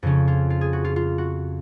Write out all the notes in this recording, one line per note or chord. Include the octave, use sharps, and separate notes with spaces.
F2 C#3 C#4
F4
F4
G#4
F#4
F4
F4
F#4